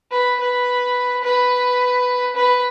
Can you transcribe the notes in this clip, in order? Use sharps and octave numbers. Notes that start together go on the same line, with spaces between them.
B4
B4
B4
B4